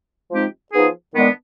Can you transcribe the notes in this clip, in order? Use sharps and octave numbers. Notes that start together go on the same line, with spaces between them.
F3 G#3 C4 D#4 G4
F3 B3 D#4 G#4
D#3 G#3 B3 D4